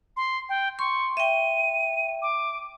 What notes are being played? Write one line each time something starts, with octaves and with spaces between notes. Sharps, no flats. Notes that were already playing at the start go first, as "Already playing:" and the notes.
C6
G5
C6 C#6
E5 G5 D#7
D6